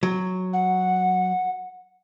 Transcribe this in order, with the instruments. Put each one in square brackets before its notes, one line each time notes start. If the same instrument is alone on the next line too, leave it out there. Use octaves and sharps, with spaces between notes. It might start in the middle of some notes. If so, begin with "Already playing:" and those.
[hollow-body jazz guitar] F#3
[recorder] F#5